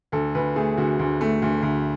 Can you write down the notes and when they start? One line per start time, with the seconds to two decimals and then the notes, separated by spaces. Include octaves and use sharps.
0.12 D2 A4
0.35 D2 B4
0.56 A3 G#4
0.77 D2 F#4
0.99 D2
1.21 A3
1.42 D2
1.62 D2